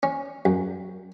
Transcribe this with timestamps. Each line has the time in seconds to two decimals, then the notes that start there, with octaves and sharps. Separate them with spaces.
0.03 C#4
0.45 F#2